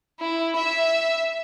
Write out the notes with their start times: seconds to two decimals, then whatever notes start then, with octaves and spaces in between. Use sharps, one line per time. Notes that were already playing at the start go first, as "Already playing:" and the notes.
0.21 E4
0.57 E5